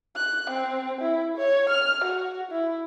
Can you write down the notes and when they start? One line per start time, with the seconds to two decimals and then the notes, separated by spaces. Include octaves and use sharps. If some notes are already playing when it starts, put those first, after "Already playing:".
0.16 F#6
0.50 C4
1.01 E4
1.38 C#5
1.70 F6
2.04 F#4
2.51 E4